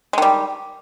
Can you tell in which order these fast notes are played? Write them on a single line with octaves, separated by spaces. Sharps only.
G#3 D#3 G3